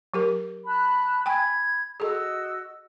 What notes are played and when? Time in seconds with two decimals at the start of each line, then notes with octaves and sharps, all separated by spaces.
0.14 F#3 G4 A#4
0.66 A5 B5 F#6
1.26 G5 G#5 B5 G#6
2.00 F#4 G#4 A4 D#5 E6